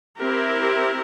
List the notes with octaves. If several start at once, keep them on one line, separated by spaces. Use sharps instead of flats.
C4 E4 G4 A#4